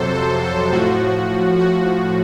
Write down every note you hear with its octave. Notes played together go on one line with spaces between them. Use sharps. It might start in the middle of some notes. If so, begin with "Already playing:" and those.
Already playing: F2 C3 F#3 A4 C5
A4
A4
A2 F3 F#4
F#4